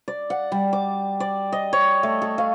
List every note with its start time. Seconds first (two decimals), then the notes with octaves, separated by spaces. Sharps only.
0.08 D5
0.30 F#5
0.52 G3
0.73 D6
1.20 D5
1.52 D#5
1.73 C#5
2.03 A3
2.22 A4
2.38 F5